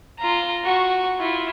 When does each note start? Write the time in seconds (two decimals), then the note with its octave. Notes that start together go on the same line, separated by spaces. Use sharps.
0.19 F4 A#5
0.64 F#4 C#6
1.19 E4 F4